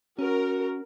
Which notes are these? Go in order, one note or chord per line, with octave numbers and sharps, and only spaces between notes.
C#4 F#4 A#4